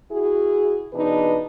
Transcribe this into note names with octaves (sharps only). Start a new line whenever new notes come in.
E4 F#4 G#4
B2 E3 D4 D#4 G#4 B4